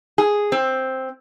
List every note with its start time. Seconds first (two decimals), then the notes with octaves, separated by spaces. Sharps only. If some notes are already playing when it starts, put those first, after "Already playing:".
0.18 G#4
0.52 C4